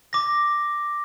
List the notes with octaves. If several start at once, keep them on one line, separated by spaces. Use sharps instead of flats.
D6 A#6